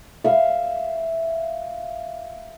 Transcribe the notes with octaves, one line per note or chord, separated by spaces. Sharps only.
E5 F5